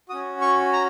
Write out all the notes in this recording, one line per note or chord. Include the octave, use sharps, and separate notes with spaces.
C#4 F#4 D#6
C#6
A#5